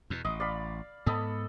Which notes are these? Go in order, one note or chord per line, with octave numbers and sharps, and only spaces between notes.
E2 B2
A1 D#5
D5 F5 B5
G#2 B3 A4 D#5 B5